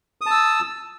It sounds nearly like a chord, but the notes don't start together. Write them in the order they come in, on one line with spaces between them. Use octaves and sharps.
D#6 A5 E6